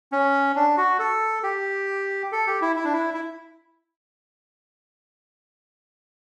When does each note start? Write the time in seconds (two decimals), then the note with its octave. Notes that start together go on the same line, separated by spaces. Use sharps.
0.12 C#4
0.56 D4
0.77 F#4
0.99 A4
1.43 G4
2.32 A4
2.47 G4
2.62 E4
2.76 E4
2.84 D4
2.93 E4
3.14 E4